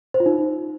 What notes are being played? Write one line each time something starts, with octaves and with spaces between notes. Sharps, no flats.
C5
F4
D#4